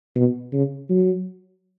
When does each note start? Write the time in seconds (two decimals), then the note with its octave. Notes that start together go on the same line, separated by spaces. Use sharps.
0.16 B2
0.53 C#3
0.89 F#3